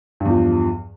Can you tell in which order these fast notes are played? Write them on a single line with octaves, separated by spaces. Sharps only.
G2 E2 F3